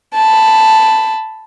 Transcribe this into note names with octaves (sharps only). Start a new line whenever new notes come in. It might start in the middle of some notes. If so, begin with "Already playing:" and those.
A5 B5